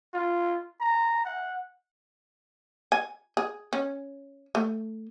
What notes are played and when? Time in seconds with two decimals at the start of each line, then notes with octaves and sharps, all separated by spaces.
0.13 F4
0.80 A#5
1.25 F#5
2.92 G#5
3.37 G#4
3.73 C#4
4.55 A3